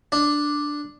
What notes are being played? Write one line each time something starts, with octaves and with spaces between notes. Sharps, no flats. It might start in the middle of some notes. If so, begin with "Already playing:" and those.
D4